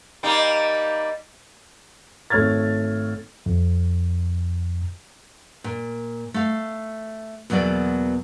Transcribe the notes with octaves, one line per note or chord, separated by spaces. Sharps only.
G3 A#3 D#4
G#1 A3 C#5 F6 G#6 A6
F2
A#2
A3 F5
E2 B2 F#3 A#3 D5